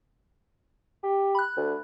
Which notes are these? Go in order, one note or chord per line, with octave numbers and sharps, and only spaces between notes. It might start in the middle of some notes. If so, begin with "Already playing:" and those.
G4
B5 F#6
D2